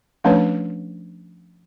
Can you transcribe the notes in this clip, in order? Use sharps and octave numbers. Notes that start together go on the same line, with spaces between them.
F3 A3 C#4 D4 B4 C#5